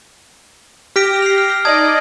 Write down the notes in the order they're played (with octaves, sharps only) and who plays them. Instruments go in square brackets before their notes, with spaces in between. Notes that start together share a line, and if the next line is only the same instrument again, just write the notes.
[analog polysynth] G4 A#6 [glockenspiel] F6 B6 D7
[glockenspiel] C7 F7
F6
[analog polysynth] D#4 D5 D#5 [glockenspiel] A5 D#6 G#6